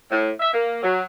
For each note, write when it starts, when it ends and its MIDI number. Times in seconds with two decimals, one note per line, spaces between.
0.10 0.29 45
0.40 0.49 76
0.53 0.79 58
0.82 1.02 54